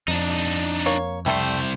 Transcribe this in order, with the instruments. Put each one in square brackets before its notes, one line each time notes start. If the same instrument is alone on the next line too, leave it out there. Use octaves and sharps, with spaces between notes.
[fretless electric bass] F2 [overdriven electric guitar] D4 D#4
[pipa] A#3 C#5
[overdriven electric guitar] C2 C5 [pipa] G3 A3